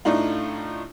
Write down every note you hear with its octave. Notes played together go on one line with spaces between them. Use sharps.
A2 A3 D4 D#4 F4